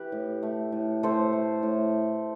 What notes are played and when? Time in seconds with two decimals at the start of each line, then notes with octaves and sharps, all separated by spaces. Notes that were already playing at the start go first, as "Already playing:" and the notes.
Already playing: E3 G4 B4
0.12 A2
0.43 A3
0.72 A2
1.03 A2 A4 C5
1.33 A3
1.63 A2